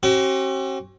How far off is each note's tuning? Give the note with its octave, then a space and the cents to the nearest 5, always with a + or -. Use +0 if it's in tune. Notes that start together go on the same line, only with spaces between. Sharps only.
C4 +45 F#4 +45